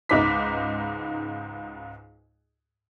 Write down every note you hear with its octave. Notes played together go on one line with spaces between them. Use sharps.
C#2 G#2 D#4 B4 D6 B6